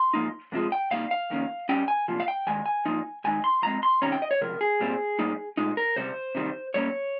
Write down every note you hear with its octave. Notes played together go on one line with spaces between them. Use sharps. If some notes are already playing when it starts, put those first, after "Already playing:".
Already playing: C6
G#2 F3 A#3 D#4
F2 C3 F3 G#3
G5
C3 G3 A#3 D#4 F5
F5
F2 D#3 A#3 C#4
G2 G3 C#4 G5
G#5
C2 A#2 F3
F5
G5
D#2 D#3 G#3 G#5
G#5
G2 F3 A#3 D#4
G2 D#3 G#3 D#4 G#5
C6
F2 C#3 G#3 C4 A#5
C6
C3 D#3 G3 C#4 A#5
G5
D#5
C#5
C#2 C3 F3 A#4
G#4
C2 A#2 G3 C4
G#2 G3 A#3 D#4
A#2 G#3 D#4
A#4
C#2 C3 G3 C5
C3 D#3 G3 C4
G#2 G3 A#3 C#4 C#5